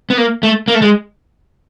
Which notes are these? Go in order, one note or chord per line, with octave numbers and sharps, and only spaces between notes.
B3
A#3
A3
A#3
A3
G#3